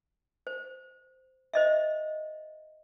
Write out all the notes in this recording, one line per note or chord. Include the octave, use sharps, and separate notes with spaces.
C5
C5 D#5 E5